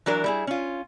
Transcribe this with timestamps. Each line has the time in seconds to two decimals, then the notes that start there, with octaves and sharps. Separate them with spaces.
0.06 E3 F#3 D4 A#4
0.24 G3 E4 G#4
0.47 C#4 F4